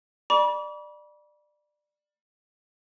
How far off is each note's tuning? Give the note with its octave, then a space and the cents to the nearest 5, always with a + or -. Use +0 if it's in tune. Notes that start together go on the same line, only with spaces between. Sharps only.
D5 +20 B5 -40 D6 -40